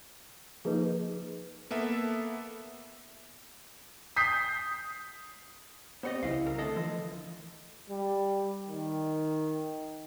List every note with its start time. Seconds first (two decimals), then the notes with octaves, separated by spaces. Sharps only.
0.65 F3 A#3 D#4 G#4 B4
1.71 A#3 B3 A4 E5
4.16 D#6 G6 B6 C7
6.03 B3 C4 G4 C5 C#5 D#5
6.23 C2 C#3 E4 F5
6.47 A#4
6.58 D3 A3 A4 D#5
6.76 E3 F3
7.90 G3
8.70 D#3